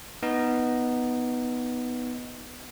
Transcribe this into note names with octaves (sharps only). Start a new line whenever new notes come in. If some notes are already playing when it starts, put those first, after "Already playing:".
B3 D#4